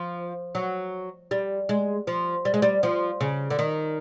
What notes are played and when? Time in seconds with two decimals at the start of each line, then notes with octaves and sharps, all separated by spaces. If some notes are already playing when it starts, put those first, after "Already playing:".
Already playing: F3
0.55 F#3
1.31 G3
1.69 G#3
2.07 F3
2.45 G3
2.54 G#3
2.62 G3
2.83 F3
3.21 C#3
3.50 D3
3.59 D#3